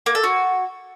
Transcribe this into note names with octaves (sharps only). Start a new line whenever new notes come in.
A#3
A4
F#4